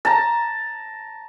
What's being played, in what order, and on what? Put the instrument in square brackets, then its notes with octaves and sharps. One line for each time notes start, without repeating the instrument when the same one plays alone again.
[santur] A5 A#5